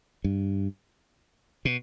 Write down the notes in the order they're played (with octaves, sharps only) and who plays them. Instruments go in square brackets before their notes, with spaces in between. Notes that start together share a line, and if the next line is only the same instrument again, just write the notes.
[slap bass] G2
B2